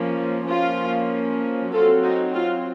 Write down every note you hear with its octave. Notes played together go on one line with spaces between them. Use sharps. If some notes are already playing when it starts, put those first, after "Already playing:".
Already playing: F3 A#3 C#4
F3 A#3 C#4 F4
F#3 C4 F4 A4
D#4 F#4
F4